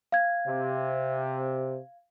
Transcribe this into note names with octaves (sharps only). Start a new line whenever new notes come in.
F5 G#6
C3